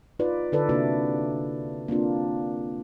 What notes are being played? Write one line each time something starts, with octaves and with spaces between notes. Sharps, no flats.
D#4 F4 B4 D5
D3 D#4 A4 B4 D5
C3 A#3 D4 E4 F#4 B4
A#3 C4 D4 F4